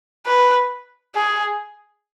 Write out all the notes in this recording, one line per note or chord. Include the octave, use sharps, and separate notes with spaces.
B4
G#4